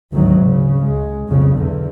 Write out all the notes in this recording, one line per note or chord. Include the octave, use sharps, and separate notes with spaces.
G#1 D2 G#2 D#3 F#3
C#3
C#2 G#3
B1 F2 C#3
E2 D3